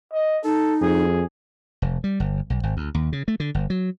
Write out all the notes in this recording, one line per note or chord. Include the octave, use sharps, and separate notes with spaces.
D#5
D#4 A4
F2 G#4
F1
G3
G1
B1
G#1
D2
D#2
C#3
A3
D3
G1
F#3